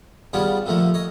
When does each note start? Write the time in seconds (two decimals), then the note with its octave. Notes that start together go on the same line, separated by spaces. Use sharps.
0.33 C#3 G3 B3 D4 F4 C#5
0.66 A#2 D3 F3 A3 A#3
0.94 C#5 D#5